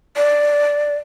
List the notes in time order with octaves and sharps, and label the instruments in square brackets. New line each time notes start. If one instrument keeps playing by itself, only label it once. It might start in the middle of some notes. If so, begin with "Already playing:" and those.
[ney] D5